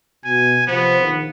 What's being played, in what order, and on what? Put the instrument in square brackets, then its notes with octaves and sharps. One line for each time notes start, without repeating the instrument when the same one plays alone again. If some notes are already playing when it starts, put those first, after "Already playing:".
[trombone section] B2 F#4 [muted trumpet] G#5
[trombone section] C3 F3 C5 [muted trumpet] B3
[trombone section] A#1 D#3 A#3